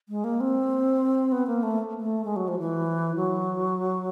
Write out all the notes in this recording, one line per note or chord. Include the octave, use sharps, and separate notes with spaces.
G#3
A#3
C4
B3
A#3
A3
A3
G#3
F#3
F3
E3
F#3